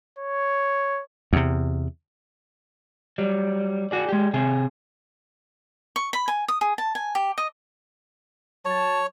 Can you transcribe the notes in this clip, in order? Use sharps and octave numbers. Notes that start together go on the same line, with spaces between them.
C#5
E2 C3
F#3 G3
F#4 G#4 D5
G#3 G4
C3 G#4
C#6
B5
G#5
D#6
G#4
A5
G#5
G4
D#5
F#3 C#5 A5